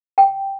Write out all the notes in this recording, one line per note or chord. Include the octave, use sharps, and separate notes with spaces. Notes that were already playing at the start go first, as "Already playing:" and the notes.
G5